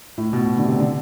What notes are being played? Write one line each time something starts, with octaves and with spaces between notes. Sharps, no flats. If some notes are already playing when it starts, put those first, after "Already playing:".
A2
B2
D3
C3
D3